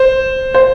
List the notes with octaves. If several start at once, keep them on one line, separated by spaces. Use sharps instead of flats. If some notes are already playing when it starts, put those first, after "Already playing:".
Already playing: C5
C5